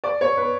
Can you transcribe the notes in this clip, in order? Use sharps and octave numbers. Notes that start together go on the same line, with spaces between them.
D5
C#5
B4